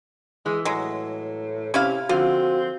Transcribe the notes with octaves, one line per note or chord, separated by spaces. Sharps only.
E3 G#3
A2 F#3 G#3
C3 C#4 E4 F5
D3 F3 C4 F4 F#4 F5